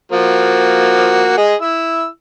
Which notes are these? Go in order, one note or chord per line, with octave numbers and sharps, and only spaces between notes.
F3 A#3 F#4
G#4 D#5
E4 E6